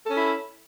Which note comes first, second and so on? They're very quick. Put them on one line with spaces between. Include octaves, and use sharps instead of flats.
A4 C#4 E4